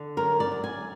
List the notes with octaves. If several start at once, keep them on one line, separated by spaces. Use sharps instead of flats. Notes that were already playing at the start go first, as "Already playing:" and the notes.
Already playing: D3
F#2 A#4
D5
F#2
G#5